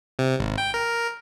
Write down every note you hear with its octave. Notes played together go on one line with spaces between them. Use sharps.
C3
G#1
G5
A#4